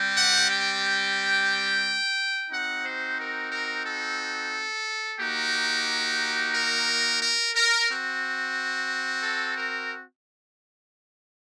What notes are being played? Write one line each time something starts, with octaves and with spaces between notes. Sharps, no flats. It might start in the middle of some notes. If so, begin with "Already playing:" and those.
Already playing: G3 C4 G4
F#5
G5
C4 D#4 F#4 F#5
C5
A#4
A#4
A4
A#3 D#4 F#4 G4
A#4
A#4
A#4
C4 F#4
A4
A#4